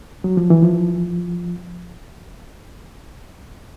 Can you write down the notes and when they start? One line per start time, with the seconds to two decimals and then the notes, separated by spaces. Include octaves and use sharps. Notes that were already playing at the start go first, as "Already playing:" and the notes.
0.24 F#3
0.37 F3
0.50 E3
0.63 F3